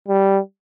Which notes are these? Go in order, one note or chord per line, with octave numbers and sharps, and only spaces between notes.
G3